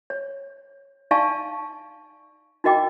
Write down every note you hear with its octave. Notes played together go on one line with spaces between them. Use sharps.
C#5
D#4 D5 F5 G#5 A5 C#6
D#4 F#4 A#4 D#5 G5 D6